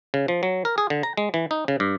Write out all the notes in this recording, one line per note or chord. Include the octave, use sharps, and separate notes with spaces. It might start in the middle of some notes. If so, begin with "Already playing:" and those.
C#3
F3
F#3
A#4
G#4
D3
A#5
G#3
E3
D#4
C#3
G2